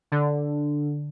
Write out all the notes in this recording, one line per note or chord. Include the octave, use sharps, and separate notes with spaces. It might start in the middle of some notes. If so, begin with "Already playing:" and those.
D3